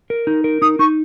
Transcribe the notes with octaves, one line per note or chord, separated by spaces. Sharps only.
A#4
D#4
A#4
D#4 D#6
D#4 C#6